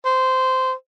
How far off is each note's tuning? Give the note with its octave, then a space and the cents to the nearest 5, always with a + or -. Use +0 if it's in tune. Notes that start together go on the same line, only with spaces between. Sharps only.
C5 -15